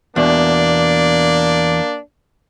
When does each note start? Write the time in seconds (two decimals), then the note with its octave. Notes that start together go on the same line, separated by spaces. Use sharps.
0.16 E2 B2 A#3 D4